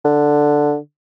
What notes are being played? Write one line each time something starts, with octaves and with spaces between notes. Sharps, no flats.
D3